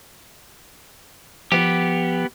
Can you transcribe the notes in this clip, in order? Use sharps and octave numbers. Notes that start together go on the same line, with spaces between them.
F3 B3 G4